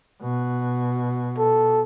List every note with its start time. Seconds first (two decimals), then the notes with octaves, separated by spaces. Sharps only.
0.22 B2
1.38 A4